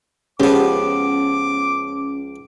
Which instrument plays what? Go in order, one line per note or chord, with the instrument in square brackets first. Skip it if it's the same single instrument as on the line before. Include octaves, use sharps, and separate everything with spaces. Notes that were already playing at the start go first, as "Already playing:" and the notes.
[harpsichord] C#2 F3 [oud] B3 G4 [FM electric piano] C#4 [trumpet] D6